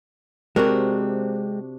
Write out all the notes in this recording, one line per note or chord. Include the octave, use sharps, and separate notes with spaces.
C3 G#3 C4 D4 F#4 A#4